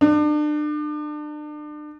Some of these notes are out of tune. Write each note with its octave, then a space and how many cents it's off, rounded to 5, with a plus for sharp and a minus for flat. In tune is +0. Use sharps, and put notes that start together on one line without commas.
D4 +35